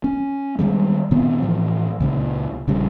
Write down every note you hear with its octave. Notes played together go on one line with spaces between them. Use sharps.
C#4
D#3 G3 G#3
A#2 D#3 B3 C4
A2 E3 F3
C#2 A#2 C#3
A#1 C#3 G3